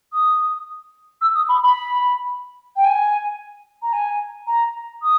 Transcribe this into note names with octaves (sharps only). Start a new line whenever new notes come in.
D#6
E6
D#6
B5
B5
G5
G#5
A#5
G#5
A#5
D#6